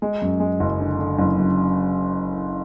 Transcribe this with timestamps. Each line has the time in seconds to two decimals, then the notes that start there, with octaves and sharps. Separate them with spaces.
0.02 G#3
0.22 F#2
0.40 G#3
0.60 F#1
0.80 D3
0.99 D3
1.19 F#1
1.38 F#2